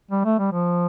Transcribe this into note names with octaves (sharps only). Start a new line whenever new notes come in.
G3
A3
G3
F3